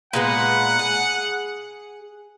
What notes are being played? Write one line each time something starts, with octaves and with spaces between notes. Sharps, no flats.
A#2 G#3 B3 F#5
G#4